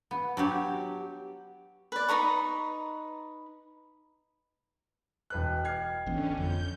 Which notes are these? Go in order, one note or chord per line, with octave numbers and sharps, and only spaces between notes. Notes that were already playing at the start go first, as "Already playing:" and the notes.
B3
F#3 D4 G4
B4 D5
D#4 B4 A#5 C#6
E1 B4 D#5 G5 F#6
F6 G#6 C7
G#1 D3 E3 B3 C#4
F2 G6